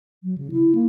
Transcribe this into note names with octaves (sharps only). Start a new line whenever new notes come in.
F#3
C#3
E4
A#3